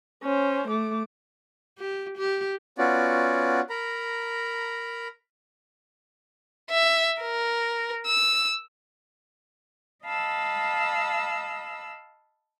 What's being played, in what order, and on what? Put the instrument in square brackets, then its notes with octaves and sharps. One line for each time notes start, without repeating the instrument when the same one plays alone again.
[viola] C#4 C5
A3 D6
[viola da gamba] G4
G4
[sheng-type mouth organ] B3 C#4 F4 F#4 D5
A#4 A#5 B5
[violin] E5
A#4
E6
[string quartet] D#5 F5 A5 B5 E6